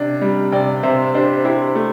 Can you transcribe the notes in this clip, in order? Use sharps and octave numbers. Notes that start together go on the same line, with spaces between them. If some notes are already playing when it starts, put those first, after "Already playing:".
Already playing: C3 D4
G3
C3 D5 G5
C3 C5 E5
D4 G4 C5
E4 G4 C5
A3